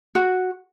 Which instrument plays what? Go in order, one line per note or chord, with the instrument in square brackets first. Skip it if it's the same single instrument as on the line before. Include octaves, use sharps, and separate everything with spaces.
[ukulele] F#4